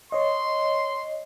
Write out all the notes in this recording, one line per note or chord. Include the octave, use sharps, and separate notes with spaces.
C#5 D#5 C6